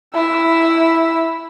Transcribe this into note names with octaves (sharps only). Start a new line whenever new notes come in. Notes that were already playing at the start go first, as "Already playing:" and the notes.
E4 E6